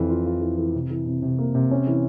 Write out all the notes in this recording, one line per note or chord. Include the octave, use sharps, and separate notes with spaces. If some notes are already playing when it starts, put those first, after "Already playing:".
Already playing: F2 E3
F4
F4
E3
E3
C3
E3
C3
C3
A#3
C3
C#4
E3